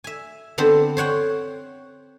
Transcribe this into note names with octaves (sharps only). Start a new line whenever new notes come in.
E5 G#5
D3 B3 C4 A4 C5
C5 C#5 F#5 G5